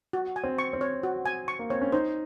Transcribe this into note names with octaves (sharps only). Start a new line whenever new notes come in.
F#4
G#5
C4
C#6
C4
C#5
F#4
G#5
C#6
A#3
C4 C#5
C#4
D#4 C5